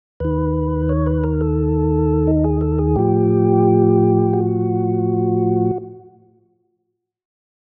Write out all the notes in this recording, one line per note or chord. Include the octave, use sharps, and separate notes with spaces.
D#2 D#3 B4
C#5
B4
A#4
A4
D#4
G#4
A4
G#4
A2 F3 G4
F#4